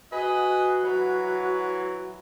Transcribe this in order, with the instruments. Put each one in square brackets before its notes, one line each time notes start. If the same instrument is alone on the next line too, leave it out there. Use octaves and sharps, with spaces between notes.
[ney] F#4 [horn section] G#4 B4 D#5
[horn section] E3 F#3